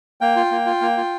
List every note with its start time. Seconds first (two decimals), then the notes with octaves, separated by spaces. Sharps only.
0.21 A#3 G5
0.36 F4
0.51 A#3
0.66 F4
0.81 A#3
0.97 F4